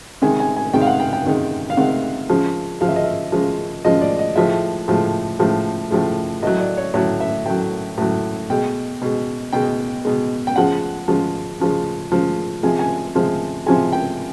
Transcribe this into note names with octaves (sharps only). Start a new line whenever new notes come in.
C3 D#3 G#3 G#5
G#5
G#5
C3 D#3 G#3 G5
F5
F#5
G5
G5
C3 D#3 G#3
F5
C3 D#3 G#3 F#5
C#3 F3 G#3
C#3 F3 G#3 F5
E5
D#5
E5
C#3 F3 G#3
C#3 F3 G#3 D#5
D5
D#5
A2 F3 G#3 E5
A2 F3 G#3
A2 F3 G#3
A2 F3 G#3
A2 F#3 D#5
D5
C#5
A2 F#3 C#5
E5
A2 F#3 G5
A2 F#3
B2 G#3 G5
B2 G#3
B2 G#3 G5
B2 G#3
G5
C#3 F3 G#3 F#5
C#3 F3 G#3
C#3 F3 G#3
C#3 F3 G#3
C3 F3 G#3 G#5
G#5
C3 F3 G#3
C3 F3 G#3 G#5
G5